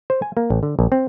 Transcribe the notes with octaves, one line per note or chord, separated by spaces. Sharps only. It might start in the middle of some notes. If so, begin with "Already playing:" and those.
C5
G#5
A#3
A1
D3
A#1
C4